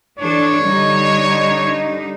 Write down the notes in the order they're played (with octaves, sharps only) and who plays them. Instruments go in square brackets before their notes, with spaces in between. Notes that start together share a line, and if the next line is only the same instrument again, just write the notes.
[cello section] E3 D4 A4 [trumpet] C#5
[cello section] D3 G3 D#4